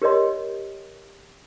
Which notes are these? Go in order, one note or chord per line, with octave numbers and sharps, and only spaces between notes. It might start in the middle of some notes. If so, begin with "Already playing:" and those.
G4 A#4 C#5 D#5 C6